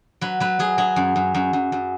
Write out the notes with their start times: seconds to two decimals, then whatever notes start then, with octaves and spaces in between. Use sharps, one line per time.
0.21 F#3 B4
0.40 F#3 B4
0.59 F#3 G#4
0.78 F#3 G#4
0.96 F#2
1.16 F#2
1.34 F#2
1.53 F#2
1.72 F#2